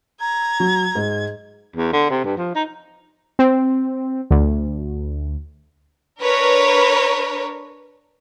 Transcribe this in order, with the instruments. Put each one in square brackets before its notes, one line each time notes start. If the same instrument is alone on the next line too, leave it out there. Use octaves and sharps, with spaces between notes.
[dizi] A#5 [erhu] G#6
[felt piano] F#3
G#2
[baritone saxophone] E2
D3
C3
G2
F3
D#4
[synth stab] C4
D2
[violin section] D4 A#4 B4 C#5